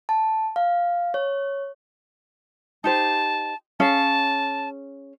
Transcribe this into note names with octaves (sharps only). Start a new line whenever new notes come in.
A5
F5
C#5
D#4 G4 C5 A5
C#4 G#4 F5 A5